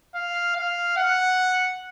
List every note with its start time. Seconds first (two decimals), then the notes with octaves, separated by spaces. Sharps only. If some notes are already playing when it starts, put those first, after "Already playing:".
0.15 F5
0.56 F5
0.97 F#5